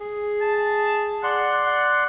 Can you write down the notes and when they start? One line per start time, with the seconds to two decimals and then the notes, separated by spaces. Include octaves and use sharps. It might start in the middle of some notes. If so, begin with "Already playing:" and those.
0.01 G#4
0.41 A5
1.24 D5 F#5 C6
1.66 F#5